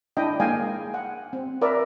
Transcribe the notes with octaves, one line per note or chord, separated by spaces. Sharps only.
D4 E4 D#5 G5
G#3 A#3 D#5 F5 G5 G#5
F#5
C4
A#4 B4 D5 E5